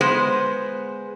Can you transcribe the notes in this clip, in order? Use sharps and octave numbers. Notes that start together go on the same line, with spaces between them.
G#3 B3 C5